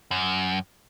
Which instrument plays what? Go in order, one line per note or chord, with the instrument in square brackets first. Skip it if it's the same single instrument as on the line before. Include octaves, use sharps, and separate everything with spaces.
[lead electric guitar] F#2